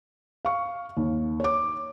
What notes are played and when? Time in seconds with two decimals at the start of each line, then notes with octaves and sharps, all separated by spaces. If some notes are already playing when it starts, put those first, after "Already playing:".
0.45 F5 C#6
0.97 D#2
1.40 C#5 D6